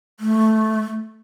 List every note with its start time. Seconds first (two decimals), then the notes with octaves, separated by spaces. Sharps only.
0.20 A3